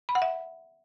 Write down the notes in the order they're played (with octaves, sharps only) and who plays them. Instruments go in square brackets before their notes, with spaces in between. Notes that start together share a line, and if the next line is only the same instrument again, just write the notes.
[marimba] B5
F#5
E5